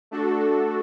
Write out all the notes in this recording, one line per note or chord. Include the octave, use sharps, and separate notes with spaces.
A3 D4 F#4 A4